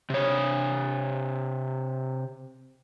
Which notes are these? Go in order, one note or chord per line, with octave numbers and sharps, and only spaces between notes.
C3 C#5